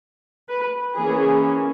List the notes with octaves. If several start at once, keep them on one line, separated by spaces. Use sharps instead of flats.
B4
E3 A#3 C#4 G#4